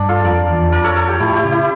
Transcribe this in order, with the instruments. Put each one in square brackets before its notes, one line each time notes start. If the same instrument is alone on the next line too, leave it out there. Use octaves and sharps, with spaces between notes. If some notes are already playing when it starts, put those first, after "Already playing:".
Already playing: [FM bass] G2 [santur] D4
[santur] F4 A4
[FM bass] F2 [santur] A#4 D5
[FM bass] E2
[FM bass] F2 [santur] A#4 D5
[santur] A4 C#5
A4 C#5
G4 A#4
[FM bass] A2 [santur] E4 G4
[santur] E4 G4
[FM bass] C#3
[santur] E4